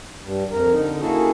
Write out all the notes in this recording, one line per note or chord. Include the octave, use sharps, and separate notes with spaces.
G2
F2 A#4
D3 D#4
A#3 C#4 E4 F#4 G#4 A4